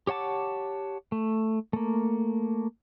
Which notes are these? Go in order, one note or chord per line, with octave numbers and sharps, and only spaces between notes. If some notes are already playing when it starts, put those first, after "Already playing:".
G4 C#5 F#5 A5 D6
A3
A3 A#3